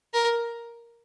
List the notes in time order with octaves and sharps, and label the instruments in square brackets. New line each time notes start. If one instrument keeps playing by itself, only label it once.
[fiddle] A#4